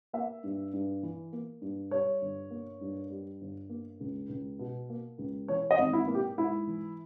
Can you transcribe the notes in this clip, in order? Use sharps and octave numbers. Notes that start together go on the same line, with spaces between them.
A#3 E5
G2
G2
E3
A#3
G2
G3 C#5
G1
A#3
G2
G3
G1
A#3
C#2
C#2
B2
A#3
C#2
E3 C#5
D#5
G#1
E4
A#3
G4
G#2 E4
E3